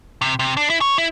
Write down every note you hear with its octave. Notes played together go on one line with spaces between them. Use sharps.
C3
C3
D4
E4
C#5
E4